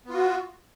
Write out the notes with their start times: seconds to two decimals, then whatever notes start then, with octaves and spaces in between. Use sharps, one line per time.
0.05 B3
0.10 F4
0.14 F#4